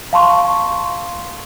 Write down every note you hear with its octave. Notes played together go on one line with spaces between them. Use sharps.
F5 A5 C6 C#6